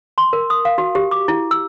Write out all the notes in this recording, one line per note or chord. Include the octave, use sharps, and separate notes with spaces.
C6
A#4
D#6
F5
F#4
G4
D6
E4
E6